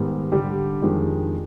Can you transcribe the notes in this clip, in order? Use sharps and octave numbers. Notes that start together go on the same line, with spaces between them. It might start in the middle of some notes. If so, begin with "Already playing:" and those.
Already playing: G#2 D#3 G3 B3
D3 G3 D4 G4
F2 D#3 G#3 D4 G4